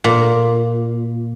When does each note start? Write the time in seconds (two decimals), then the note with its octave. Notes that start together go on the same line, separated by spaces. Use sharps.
0.04 A#2